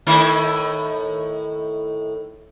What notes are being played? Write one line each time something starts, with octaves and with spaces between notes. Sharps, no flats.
A2 D#3 E4